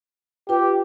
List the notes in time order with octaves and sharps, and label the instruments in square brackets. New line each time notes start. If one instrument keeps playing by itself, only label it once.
[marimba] F4 B4 [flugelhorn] G4